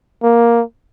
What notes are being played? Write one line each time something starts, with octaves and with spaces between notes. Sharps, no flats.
A#3